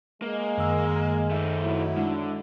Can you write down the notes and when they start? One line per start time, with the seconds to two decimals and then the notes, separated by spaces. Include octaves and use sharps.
0.22 G#3 A#3
0.58 F#2 D#3 E6
1.30 A3 D#4
1.63 F#3 E4
1.97 D3 G#3